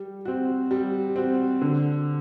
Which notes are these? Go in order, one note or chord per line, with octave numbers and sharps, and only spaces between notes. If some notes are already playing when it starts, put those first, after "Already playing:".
Already playing: G3
C4 F#4
G3
C4 F#4
D3